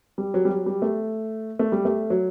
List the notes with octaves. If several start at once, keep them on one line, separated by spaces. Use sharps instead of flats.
G3
F#3
G3
F#3
G3
A3
A3
G3
A3
F#3